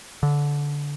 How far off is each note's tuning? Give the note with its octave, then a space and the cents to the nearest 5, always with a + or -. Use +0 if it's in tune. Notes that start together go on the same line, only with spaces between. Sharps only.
D3 -20